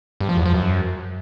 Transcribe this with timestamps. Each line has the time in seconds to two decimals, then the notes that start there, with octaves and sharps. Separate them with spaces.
0.21 G2
0.29 F3
0.37 E2
0.46 F3
0.54 F#2